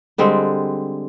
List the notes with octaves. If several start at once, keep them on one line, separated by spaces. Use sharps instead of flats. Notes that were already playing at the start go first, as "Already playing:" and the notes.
D3 G3 G#3 C4